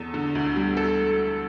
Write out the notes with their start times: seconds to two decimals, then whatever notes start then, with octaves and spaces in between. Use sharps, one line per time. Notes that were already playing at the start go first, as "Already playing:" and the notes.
Already playing: E2 A4
0.14 D3
0.35 D2
0.56 G3
0.77 A4